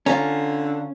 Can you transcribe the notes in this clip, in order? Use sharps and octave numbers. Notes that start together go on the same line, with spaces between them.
D3 C#4 F4 A#5